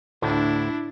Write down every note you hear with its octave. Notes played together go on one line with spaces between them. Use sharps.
D2 A2 D4 E4